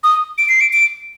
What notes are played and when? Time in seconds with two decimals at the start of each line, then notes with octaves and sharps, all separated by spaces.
0.04 D#6
0.38 D7
0.49 C7
0.61 D7
0.73 D7